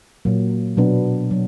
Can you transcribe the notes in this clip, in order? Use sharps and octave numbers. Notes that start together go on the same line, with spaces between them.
A#2 F#3 A#3
B2 F#3 B3 D4
F#3